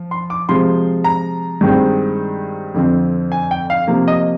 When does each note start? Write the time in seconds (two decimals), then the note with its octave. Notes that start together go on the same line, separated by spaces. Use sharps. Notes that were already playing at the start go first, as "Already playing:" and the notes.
Already playing: F3
0.11 C6
0.30 D6
0.49 C3 F3 G#3 C6
1.04 A#5
1.61 G2 D#3 G#3 C4
2.74 F2 D3 F3 C4
3.32 G#5
3.51 G5
3.70 F5
3.88 C3 F3 A#3
4.08 D#5